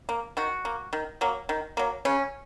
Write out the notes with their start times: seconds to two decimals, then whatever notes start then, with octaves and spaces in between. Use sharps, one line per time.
0.09 A#3
0.37 D#3 F#4
0.65 A#3
0.93 D#3
1.21 F#3 A#3
1.49 D#3
1.77 F#3 A#3
2.05 C#3 C#4